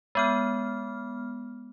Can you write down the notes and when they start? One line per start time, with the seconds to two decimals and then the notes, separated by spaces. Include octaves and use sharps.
0.15 G#3 B3 F6